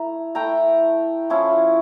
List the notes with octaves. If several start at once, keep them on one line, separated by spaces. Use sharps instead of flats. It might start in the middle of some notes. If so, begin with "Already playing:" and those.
Already playing: A3 E4 A#5
A3 E4 G5 A#5
F3 C#4 E4